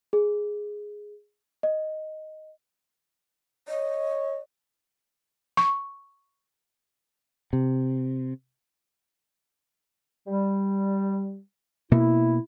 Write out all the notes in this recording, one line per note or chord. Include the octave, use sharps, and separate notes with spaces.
G#4
D#5
C#5 D#5
C#6
C3
G3
B2 A#3 E4